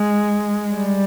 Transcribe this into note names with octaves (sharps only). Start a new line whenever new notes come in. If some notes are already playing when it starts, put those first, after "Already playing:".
Already playing: G#3
G3